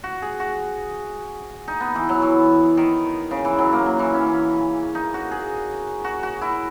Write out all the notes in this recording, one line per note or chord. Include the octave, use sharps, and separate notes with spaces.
F#4
G#4
F#4
D#4
B3
E3
F#3
E3
D#3
C#3
E3
F#3
A#3
F#3
E3
C#4
C#4
D#4
F#4
G#4
F#4
F#4
E4